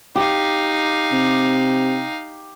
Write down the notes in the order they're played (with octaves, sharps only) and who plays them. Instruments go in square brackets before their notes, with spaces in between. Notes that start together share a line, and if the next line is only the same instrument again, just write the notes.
[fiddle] D#4 F5 [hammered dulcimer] G4
[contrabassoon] C3